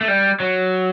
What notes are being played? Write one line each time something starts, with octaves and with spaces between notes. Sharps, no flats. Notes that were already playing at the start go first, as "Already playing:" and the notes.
A3
G3
F#3